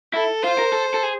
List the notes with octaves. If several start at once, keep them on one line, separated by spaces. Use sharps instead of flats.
E4 A4
F4 C5
A#4
A4
A4
G#4